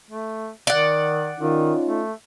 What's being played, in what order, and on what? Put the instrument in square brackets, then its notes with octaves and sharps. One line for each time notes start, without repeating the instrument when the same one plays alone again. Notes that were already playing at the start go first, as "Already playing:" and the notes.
[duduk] A3
[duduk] D#3 [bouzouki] D5 F#5
[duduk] D#3 [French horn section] C#4 D#4 F4
[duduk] A3